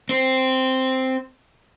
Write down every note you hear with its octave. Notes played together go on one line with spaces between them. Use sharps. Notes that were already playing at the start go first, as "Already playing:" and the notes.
C4 C5